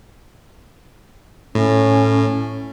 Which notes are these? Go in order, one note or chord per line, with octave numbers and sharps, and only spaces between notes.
A2 C#4